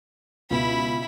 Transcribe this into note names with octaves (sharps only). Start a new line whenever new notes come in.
C#2 B2 E4 B5